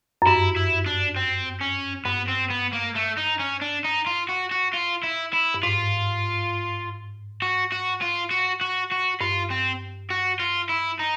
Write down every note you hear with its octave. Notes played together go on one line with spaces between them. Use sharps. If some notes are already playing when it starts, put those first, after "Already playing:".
F#2
G2 E4
E4
D4
C4
C#4
G2 B3
C4
B3
A#3
A3
D#4
C#4
D4
D#4
F4
F#4
F#4
F4
E4
E4
G2
G#2 F4
F#4
F#4
F4
F#4
F#4
F#4
G2 F4
C4
F#4
F4
E4
D#4